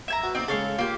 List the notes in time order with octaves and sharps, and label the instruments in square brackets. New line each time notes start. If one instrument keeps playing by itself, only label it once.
[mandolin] E5 G#5 A#5
[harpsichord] F#4 B4
[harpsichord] A#3 D#4 [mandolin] C4 D5
[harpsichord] C#3 G#3 [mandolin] A4 C#5 F5
[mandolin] A#3 G4 [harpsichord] F4